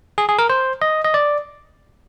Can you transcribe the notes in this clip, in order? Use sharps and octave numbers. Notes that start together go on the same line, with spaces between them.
G#4
G#4
A#4
C5
D#5
D#5
D5